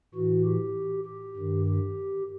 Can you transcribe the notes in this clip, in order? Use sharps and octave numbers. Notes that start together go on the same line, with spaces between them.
A2 E3 F#4
G4
G4
G2 D#3
G4